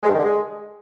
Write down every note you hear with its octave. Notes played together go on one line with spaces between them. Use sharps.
G#3
G2
D#3
D3
G#3